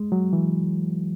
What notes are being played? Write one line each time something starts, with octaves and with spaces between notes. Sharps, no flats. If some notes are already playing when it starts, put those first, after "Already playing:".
Already playing: G#3
F#3
E3